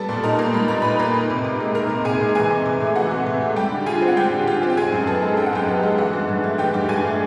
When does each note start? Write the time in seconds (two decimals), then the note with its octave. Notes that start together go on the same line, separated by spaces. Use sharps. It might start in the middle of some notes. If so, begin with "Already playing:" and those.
Already playing: G3 B3 A4 A5
0.09 A#2
0.24 D#4 A#4 A#5
0.39 A#3
0.54 G3 B5
0.68 A#2 A#5
0.82 D#4 B4 B5
0.99 A#3
1.15 D#3
1.30 C3
1.45 C3
1.60 G#3
1.75 D#3 A#4 A#5
1.90 C3
2.05 C3 G#4 G#5
2.20 G#3
2.35 E3 G#4 G#5
2.51 C3
2.66 C3
2.80 A3
2.95 E3 F#4 F#5
3.11 C3
3.26 C3
3.41 A3
3.56 G3 G4 G5
3.72 D3
3.86 F4 G#4 G#5
4.02 C4
4.08 F#5
4.17 G3 G4 G5
4.32 D3
4.47 F4 G4 G5
4.63 C4
4.70 G5
4.77 D#3 G#4 G#5
4.93 F#2
5.07 B3 A4 A5
5.22 G#3
5.37 D#3 G5
5.46 F#5
5.53 F#2 G4 G5
5.68 B3
5.83 G#3
5.98 E3 F#4 F#5
6.13 G2
6.29 G2
6.44 A3
6.58 E3 G4 G5
6.74 G2
6.89 G2 G#4 G#5
7.04 A3